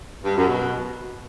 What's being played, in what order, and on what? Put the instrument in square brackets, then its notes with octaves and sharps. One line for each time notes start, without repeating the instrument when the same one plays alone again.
[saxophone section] G2
F#2
B2